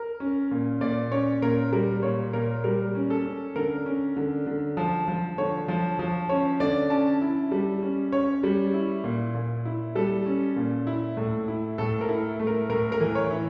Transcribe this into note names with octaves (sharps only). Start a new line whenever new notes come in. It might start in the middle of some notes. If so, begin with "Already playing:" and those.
Already playing: A#4
C#4
A#2
A#2 D5
C#4 C#5
A#2 A#4
G3 A#4
A#2 C#5
A#2 A#4
G3 A#4
C#4
A4
C#4
D3 A#4
C#4
D3
D3
F3
F3
D3 C#5
F3
F3
C#4 C#5
D3 D5
C#4 A5
E4
G3
C#4
C#4 C#5
G3
E4
A#2
A#2
E4
G3 A4
C#4
A#2
E4
A2
E4
A2 A4
A#4
E4
A3
A#4
A2 A#4
A#4
E3
C#5
E4